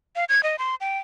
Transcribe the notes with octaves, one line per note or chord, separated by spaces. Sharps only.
F5
G#6
D#5
C6
G5